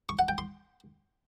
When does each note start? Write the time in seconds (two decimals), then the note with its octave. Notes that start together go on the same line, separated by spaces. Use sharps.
0.09 C#6
0.19 F#5
0.28 G5
0.38 C6